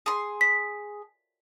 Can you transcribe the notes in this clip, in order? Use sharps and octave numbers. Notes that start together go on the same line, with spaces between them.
G#4 C6
B6